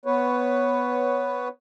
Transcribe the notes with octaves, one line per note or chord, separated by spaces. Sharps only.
B3 B4 C#5